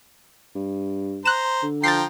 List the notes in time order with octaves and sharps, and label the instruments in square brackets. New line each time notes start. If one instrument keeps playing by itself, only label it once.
[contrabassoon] G2
[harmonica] C5 A#5 [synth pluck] F#6 E7
[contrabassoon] D3
[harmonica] F3 G5 A#5 [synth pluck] A6 C7